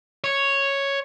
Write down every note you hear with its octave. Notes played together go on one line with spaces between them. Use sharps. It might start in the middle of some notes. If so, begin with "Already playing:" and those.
C#5